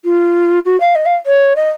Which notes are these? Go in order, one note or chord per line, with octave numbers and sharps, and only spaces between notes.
F4
F#4
F5
D#5
F5
C#5
D#5